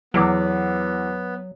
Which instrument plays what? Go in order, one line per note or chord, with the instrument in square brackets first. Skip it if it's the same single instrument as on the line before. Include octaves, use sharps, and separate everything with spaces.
[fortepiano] E2 D6 [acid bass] F#3 [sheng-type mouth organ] B3